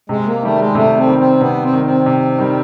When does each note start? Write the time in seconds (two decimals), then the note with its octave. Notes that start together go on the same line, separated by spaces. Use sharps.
0.09 C3 G#3
0.26 A#3
0.43 D#3 G3 A3
0.59 G#3
0.75 C3 A3
0.97 C4
1.07 D#3 G3
1.18 C4
1.41 C3 B3
1.63 C4
1.73 D#3 G3
1.85 C4
2.06 C3
2.38 D#3 G3